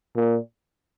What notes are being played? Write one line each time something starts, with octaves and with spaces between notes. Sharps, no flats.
A#2